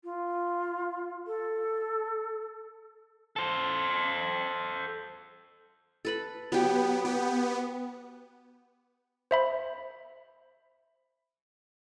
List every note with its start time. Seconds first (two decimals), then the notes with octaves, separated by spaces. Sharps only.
0.04 F4
1.27 A4
3.36 A4 C5
6.05 A4 B4 B5
6.52 F#3 B3 G4
7.05 B3 G4
9.31 C5 E5 B5